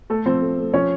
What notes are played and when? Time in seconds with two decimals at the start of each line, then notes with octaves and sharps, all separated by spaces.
0.10 A3 A4
0.26 F3 C4 C5
0.42 A3
0.58 A3
0.74 F3 C#4 C#5